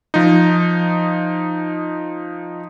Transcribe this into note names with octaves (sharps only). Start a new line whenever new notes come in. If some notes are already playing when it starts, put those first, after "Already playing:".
F3 D#4